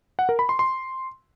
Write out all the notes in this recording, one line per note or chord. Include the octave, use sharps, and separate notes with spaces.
F#5
A#4
B5
C6
C6